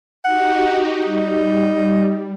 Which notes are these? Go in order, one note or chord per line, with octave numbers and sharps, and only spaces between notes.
D#4 F#4 G4 F#5
G3 D#4